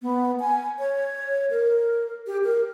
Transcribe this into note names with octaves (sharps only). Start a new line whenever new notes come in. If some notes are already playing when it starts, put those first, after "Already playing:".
B3
G#5
C#5
A#4
G4
A#4